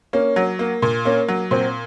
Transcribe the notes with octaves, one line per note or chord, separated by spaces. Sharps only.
A#3 C#4
F#3
A#3
A#2
A#3 C#4
F#3
A#2 C4